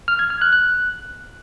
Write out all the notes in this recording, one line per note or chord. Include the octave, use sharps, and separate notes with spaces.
F6
G#6
F6
F#6
F#6